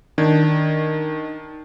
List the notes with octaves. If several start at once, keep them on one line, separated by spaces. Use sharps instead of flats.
D#3 D4 G#6